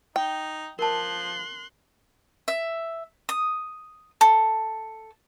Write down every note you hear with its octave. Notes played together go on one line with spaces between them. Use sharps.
D#4 G5
F3 A#4 A5 C6 F#6
E5
D#6
A4